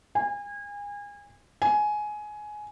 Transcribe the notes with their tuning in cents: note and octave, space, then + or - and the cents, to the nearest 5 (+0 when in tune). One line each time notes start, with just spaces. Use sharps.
G#5 -30
G#5 +15